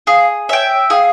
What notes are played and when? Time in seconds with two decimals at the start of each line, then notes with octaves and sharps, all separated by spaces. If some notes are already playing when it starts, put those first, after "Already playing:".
0.07 G#4 F5
0.49 C#5 E5 G5
0.90 G#4 F5